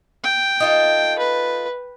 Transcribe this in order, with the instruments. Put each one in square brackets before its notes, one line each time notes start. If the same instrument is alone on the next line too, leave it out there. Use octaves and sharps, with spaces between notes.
[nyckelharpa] G5
[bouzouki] D#4 F4 A4
[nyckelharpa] B4